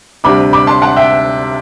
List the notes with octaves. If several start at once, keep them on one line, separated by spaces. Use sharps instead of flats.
D2 C3 G3 D4 B5 D6
B5 D6
A5 C6
F#5 A5
E5 G5